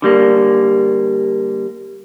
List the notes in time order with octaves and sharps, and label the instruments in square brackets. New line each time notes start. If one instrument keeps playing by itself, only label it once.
[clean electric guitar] D3 G3 A#3